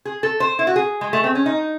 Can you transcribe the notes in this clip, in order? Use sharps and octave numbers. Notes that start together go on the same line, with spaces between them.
G#4
A4
C5
E4
F#4
G#4
G#3
A3
C4
C#4
D#4